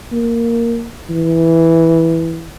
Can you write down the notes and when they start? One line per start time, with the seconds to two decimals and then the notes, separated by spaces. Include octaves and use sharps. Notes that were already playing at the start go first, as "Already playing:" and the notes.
0.12 A#3
1.10 E3